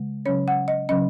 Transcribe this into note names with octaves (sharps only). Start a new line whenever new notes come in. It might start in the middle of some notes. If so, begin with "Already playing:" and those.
Already playing: C#3 G#3
C#3 F#3 C#4 C#5
F#5
D#5
C#3 F#3 C#4 D#5